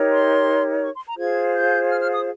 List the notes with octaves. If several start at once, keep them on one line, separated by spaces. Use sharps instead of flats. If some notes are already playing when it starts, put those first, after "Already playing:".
Already playing: D#4 G4 A#4 C#5
C6
C#6
C6
A#5
F4 G#4 C5 G#6
G6
F6
F6
D#6